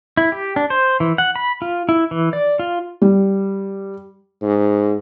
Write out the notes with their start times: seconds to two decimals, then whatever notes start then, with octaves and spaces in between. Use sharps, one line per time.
0.17 E4
0.32 G4
0.56 D4
0.70 C5
1.00 E3
1.18 F#5
1.36 B5
1.62 F4
1.89 E4
2.11 E3
2.33 D5
2.59 F4
3.02 G3
4.42 G#2